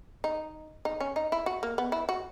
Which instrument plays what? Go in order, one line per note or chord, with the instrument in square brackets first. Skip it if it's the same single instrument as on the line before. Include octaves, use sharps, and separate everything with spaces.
[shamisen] D#4
D#4
C#4
D#4
E4
F#4
A#3
B3
E4
F#4